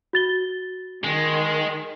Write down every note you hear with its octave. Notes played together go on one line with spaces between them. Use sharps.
F#4 A6 G7
D#3 G#3